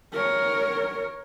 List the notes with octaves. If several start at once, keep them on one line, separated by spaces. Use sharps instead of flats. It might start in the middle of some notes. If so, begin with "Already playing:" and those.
A#4 C#5